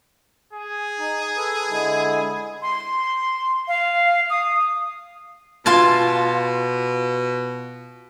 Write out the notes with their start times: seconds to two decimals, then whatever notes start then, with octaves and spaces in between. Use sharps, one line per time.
0.53 G#4
0.99 D#4
1.37 A4 B4
1.69 D3 G#3 E4
2.62 C6
3.68 F5
4.30 D#6
5.66 B2 F4 G#5 A5